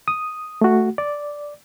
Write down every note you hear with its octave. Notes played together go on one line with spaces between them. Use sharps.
D#6
A3 F#4
D5